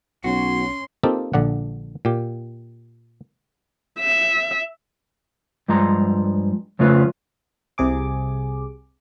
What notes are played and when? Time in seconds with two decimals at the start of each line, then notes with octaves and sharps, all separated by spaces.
0.24 B1 C#4 F#4 C6
1.03 A#3 C4 D#4 F4 G4 A4
1.33 A#1 D3 D5 F#5
2.05 A#2 G4
3.99 E5
5.68 G2 F3 G#3 A#5 C6
6.79 F2 C#3 A3 F4 B4
7.78 C2 C3 G#4 D6